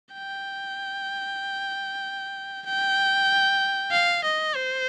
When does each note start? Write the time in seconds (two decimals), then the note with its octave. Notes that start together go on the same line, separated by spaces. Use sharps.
0.13 G5
2.66 G5
3.92 F5
4.24 D#5
4.56 C5